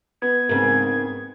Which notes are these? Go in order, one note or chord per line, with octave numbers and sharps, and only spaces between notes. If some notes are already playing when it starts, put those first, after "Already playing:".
B3 G#6
G#2 C#3 C4 A#4